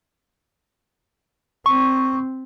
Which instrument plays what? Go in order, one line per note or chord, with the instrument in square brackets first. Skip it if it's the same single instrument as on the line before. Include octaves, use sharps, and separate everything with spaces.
[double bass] C4 [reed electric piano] C#6